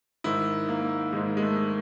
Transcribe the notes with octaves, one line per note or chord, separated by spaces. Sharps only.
G#2 D#3 E4
A#3
G#2 D#3 G#3
G#3
A3